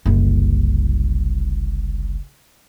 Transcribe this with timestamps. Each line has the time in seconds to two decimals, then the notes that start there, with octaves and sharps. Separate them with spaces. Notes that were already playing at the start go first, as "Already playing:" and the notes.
0.05 F#1 C2